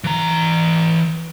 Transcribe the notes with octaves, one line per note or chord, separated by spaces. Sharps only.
E3 A#5